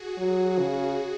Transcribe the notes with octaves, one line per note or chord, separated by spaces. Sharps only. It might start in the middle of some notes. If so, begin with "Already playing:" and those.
Already playing: F#4 G#4
F#3
C#3